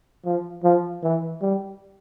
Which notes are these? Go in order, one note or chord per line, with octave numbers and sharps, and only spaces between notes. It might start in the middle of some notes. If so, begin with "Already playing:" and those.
F3
F3
E3
G3